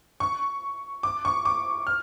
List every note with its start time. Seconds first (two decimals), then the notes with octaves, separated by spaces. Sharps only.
0.20 C#6
1.03 D6
1.25 C#6
1.45 D6
1.87 F6